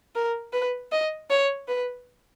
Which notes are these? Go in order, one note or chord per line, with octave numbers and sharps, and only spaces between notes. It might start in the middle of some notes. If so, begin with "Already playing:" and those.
A#4
B4
D#5
C#5
B4